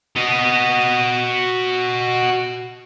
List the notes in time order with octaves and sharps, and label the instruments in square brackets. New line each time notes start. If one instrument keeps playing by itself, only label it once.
[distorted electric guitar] F#4 D#5